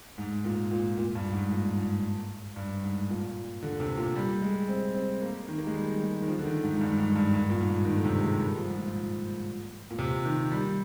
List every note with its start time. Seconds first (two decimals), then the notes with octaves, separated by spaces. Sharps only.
0.18 G#2
0.45 A#2
0.71 A#2
0.98 A#2
1.15 G2
1.33 G#2
1.51 A#2
1.77 G#2
2.56 G2
2.84 G#2
3.10 A#2
3.63 D3
3.80 C3
3.98 A#2
4.16 G3
4.42 G#3
4.68 C4
4.95 C4
5.22 A#3
5.48 D#3
5.58 A#3
5.67 G#3
5.75 G3
6.02 G#3
6.22 D#3
6.28 F3
6.39 D3
6.46 D#3
6.64 G#2
6.76 G#2
6.81 G2
6.98 G#2
7.16 G2
7.34 G2
7.50 A#2
7.61 G#2
7.85 D#3
7.95 D3
8.04 C3
8.23 G#3
8.40 G3
8.58 F3
8.68 G#2
8.75 A#2
9.91 A#2
9.99 C3
10.25 D#3
10.52 G3